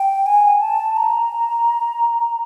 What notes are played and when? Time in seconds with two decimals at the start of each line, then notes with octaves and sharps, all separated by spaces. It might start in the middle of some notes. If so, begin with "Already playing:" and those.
Already playing: G5
0.26 G#5
0.61 A5
0.97 A#5